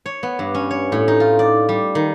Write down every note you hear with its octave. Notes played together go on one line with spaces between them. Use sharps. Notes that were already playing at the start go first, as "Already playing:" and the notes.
C#5
B3
G2
C#4
C#5
A2
D#4
F4
D5
G3
D#3